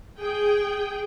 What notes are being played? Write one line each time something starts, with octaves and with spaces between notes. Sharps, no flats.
G#4 G5